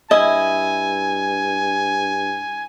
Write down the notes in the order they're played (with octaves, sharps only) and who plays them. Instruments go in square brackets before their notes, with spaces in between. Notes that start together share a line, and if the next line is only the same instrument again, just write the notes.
[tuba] G2 [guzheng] E4 [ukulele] D#5 [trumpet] G#5